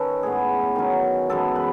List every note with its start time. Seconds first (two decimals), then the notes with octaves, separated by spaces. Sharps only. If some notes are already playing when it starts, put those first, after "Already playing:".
Already playing: D#3 C#4 A4 B4 C#5 D#5
0.23 A2 G#3 B3 G#4
0.76 D#3 F#3 C#4
1.29 F#2 E3 G#3 B3 A4
1.56 B4